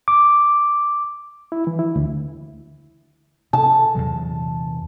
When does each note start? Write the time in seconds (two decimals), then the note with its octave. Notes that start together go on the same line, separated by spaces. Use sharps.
0.08 D6
1.52 E4
1.67 E3
1.79 E4
1.96 D2
3.53 C3 A5
3.95 E2 C3 F#3